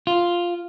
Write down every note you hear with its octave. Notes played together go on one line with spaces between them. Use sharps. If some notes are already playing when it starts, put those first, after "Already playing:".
F4